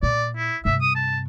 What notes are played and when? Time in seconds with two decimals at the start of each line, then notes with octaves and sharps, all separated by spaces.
0.03 A#2 D5
0.37 E4
0.65 G2 C3 E5
0.81 D#6
0.95 A5